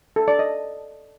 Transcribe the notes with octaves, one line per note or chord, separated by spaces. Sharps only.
A4
D5
D#5